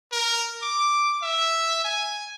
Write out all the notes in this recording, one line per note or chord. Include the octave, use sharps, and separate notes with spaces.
A#4
D6
E5
G#5